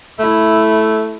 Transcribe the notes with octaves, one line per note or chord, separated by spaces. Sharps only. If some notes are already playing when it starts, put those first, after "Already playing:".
A3 E4